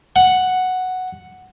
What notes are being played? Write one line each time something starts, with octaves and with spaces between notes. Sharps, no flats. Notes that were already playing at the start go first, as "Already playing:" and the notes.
F#5